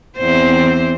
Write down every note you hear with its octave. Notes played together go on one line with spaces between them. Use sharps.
E2 C4 C5